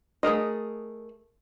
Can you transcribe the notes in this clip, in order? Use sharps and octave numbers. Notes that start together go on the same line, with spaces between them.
A3 G#4 A#4 D#5